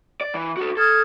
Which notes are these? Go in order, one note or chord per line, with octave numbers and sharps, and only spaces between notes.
D5
E3
F#4 A4
A4 D#6 F6 G#6